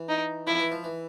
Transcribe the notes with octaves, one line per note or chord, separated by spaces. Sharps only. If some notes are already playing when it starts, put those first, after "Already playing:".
Already playing: E3
D#4
F3 E4
E3
F3
E3